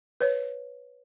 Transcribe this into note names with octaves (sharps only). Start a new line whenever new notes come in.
B4 C#5